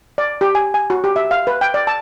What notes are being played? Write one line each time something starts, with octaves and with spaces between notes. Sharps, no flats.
D5
G4
G#5
G#5
F#4
G4
E5
F5
B4
G5
D5
A5